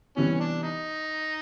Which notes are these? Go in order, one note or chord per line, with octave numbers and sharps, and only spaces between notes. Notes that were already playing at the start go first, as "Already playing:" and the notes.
C3 E3 G3 B3 C#4
D4
D#4